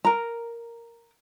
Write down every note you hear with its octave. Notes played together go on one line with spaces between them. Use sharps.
A#4 A#5